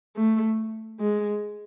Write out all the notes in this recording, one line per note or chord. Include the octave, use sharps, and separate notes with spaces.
A3
G#3